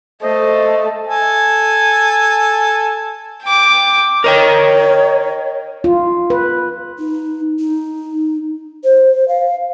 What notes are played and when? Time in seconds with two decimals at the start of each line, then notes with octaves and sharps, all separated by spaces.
0.22 A3 C5 D#5
1.07 A4 G#5
3.43 G5 D6
4.24 A#4 C#5 D#5 G5
5.84 F4
6.30 B4
6.99 D#4
7.59 D#4
8.84 C5
9.28 F5